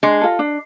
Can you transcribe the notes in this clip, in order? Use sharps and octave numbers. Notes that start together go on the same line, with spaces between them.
G#3 D4
F4 A4
D4